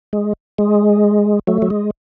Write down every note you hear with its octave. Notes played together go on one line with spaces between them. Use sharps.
G#3
G#3
F#3 A3
F#3
G#3